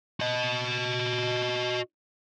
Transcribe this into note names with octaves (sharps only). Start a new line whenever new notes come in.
F#4 D#5